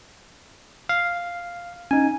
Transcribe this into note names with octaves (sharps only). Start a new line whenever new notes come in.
F5
C#4 D#4 G#5